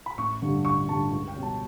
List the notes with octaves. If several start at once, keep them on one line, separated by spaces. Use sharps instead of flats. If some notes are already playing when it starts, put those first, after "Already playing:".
B5
A1 C#6
G2 D3 G3
A1 C#6
G2 D3 G3 A5
C#2
G5
B2 G3 C#4
A5